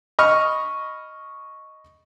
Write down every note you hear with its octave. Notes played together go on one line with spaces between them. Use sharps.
D#5 B5 C#6 F6